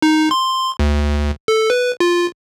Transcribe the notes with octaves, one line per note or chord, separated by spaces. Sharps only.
D#4
C6
D2
A4
B4
F4